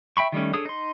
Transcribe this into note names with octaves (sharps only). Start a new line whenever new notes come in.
E5 G5 B5 C#6
D#3 G3 A3 C#4
D4 G#4 A4 C#5 D#6
D#4 C6